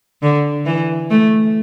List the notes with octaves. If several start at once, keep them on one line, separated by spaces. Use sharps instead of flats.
D3
E3
A3